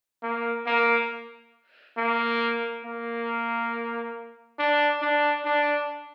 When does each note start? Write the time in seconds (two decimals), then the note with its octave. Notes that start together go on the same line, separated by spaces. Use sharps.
0.23 A#3
0.67 A#3
1.98 A#3
2.85 A#3
4.59 D4
5.02 D4
5.46 D4